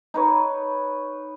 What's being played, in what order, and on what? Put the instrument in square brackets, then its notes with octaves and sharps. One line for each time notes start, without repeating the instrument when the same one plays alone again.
[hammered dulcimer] D#4 B4 C#5